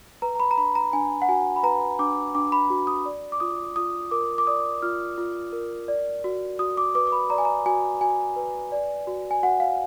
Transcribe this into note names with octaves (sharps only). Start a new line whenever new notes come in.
B4 A#5
A#5
B5
A#5
D4 B5
A#5
D4 G#5
F#5
F#4 G#5
B5
B4 A#5
D4 D6
D4 D6
B5
F#4
D#6
D5
D6
F4 D#6
F4 D#6
A#4 D6
D6
D5 D#6
F4 F6
F4
A#4
D5
F#4
F#4 D#6
D6
B4 D6
D6
B5
D5 A#5
G#5
A#5
F#4 G#5
F#4 G#5
B4
D5
F#4
G#5
F#4 F#5
F5